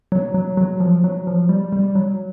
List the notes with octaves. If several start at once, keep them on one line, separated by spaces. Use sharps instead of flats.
F#3
F#3
F#3
F3
F#3
F3
G3
G3
F#3